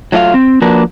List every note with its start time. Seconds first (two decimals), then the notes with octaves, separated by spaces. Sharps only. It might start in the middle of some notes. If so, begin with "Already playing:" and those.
0.12 F#3 A3 F4 D5 F5
0.34 C4
0.62 F3 A#3 D4 F#4 A#4 B4